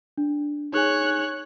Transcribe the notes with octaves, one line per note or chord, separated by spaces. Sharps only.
D4
D#4 G#4 C#5 G#5 F#6